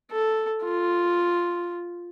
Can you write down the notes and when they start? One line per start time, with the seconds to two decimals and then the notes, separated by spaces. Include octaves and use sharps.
0.12 A4
0.64 F4